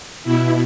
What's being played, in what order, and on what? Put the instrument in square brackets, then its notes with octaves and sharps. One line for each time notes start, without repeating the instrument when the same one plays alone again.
[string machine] B2 E4